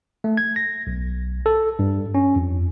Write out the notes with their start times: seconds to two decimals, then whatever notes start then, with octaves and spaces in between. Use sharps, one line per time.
0.24 A3
0.37 G#6
0.56 A#6
0.87 B1
1.46 A4
1.79 G2
2.14 C#4
2.36 F2